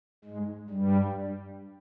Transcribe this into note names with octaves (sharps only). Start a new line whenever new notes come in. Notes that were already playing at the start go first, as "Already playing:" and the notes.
G#2 G#3
G2 G3